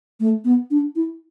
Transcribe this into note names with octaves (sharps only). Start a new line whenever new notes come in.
A3
B3
D4
E4